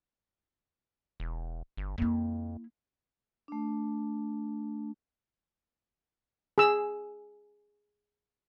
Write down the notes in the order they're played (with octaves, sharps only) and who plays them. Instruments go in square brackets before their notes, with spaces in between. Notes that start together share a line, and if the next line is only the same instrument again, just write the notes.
[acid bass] E1
G1
[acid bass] F2 [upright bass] A#3 E4
[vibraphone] A3 D4
[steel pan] G#4 E6